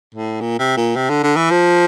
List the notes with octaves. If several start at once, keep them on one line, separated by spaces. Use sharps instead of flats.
A2
A#2
C3
A#2
C3
D3
D3
E3
F3